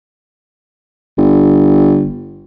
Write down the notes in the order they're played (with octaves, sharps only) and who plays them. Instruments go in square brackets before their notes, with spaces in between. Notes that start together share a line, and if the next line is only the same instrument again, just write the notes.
[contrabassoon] G1